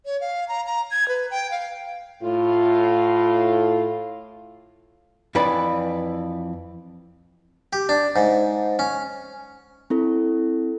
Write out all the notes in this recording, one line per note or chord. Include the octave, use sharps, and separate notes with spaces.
C#5
F5
A#5
A#5
G#6
B4
G5
F5
A2 F4
F2 E3 B4 D5 B5
G4
D4
G#2
C#4
C4 E4 A4